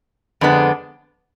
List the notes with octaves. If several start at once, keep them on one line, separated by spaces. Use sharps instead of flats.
F2 D3 G#3 B3 D4